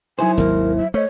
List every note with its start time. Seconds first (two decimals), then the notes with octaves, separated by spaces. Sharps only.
0.19 F#3 D#4 E4 C5 G#5
0.37 G#1 D#2 F#3 A#4
0.78 E5
0.94 A3 C5 C#5 D#5